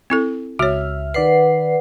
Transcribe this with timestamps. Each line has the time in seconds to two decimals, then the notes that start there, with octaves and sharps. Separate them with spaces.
0.10 C4 E4 A4
0.59 C#2 F#4 C#5 E5 F6
1.14 D#3 B4 D5 F#5 C7